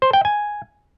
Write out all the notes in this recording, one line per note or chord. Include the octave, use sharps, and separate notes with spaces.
C5
G5
G#5